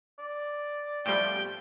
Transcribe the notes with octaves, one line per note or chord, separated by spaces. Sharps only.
D5
A2 F3 G3 G5